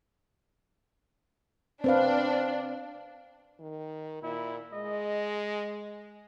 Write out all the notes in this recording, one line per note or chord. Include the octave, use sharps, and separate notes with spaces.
C4 D4 B4 F5
D#3
A#2 E4
G#3 D#5